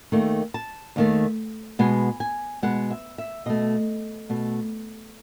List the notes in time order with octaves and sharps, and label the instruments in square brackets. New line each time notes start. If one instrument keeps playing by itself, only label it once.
[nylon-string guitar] D#2 D#3 A3
A5
D#2 D#3 A3
B2 G#3 B3 G#5
G#5
B2 G#3 B3 F#5
E5
E5
B2 A3 D#5
B2 A3